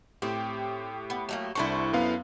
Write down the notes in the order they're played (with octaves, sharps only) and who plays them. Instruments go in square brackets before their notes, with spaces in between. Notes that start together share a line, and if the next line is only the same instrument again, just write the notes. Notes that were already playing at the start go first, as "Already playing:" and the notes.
[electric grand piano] A2 G4 [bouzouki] C4
[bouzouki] B3
F#3 A3 A#3
[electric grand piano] C2 D4 C#6 [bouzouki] E4 A4 C5
[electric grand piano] F#2 B3 F5